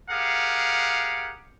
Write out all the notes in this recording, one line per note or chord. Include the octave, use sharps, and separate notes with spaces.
G4 G#4 A#4 F5 F#5